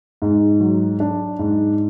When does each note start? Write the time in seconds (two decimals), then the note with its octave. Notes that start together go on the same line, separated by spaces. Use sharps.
0.22 G#2
0.60 F#3
1.00 D4
1.39 G#2